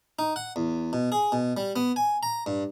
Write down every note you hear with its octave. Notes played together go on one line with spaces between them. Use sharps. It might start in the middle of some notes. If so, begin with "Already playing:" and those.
D#4
F#5
E2
B2
G#4
B2
G3
B3
G#5
A#5
G2